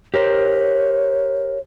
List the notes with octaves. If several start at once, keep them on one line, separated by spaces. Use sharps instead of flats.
G4 A#4 C5 C#5